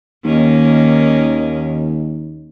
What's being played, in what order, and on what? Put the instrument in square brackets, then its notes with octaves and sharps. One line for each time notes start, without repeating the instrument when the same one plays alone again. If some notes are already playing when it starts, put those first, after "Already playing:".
[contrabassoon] D#2 [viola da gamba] D#3 A#3 C#4